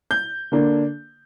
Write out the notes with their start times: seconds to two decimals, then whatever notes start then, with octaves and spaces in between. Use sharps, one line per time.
0.11 G6
0.52 D3 A#3 D4